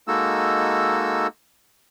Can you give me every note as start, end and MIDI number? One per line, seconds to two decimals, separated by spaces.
0.08 1.27 56
0.08 1.27 58
0.08 1.27 63
0.08 1.27 66
0.08 1.27 69
0.08 1.27 88